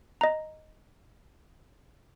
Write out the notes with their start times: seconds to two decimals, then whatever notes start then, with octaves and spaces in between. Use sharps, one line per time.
0.21 D#5 A#5